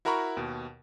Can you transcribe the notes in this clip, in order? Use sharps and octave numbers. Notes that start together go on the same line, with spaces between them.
E4 F#4 A#4 A#5 B5 C#6
D#2 B2